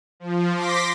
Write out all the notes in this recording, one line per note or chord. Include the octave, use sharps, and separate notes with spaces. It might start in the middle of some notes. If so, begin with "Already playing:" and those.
F3
C6 D6 A#6 B6